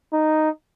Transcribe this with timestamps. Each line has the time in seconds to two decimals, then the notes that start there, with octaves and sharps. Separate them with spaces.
0.13 D#4